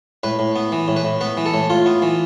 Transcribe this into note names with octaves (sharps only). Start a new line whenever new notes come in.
A2 B4
A2
B3
E3
A2
B4
A2
B3 B4
E3
A4
A2
A2 F4
B3
E3